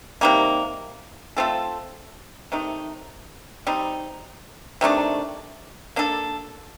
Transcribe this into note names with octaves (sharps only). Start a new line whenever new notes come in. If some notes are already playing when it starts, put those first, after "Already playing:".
C3 D#3 G3 A#3
A3 C4 F4 A4
C3 D#3 A3 D#4
G3 C4 D#4
C3 D#3 A3 D4
A#3 D4 A4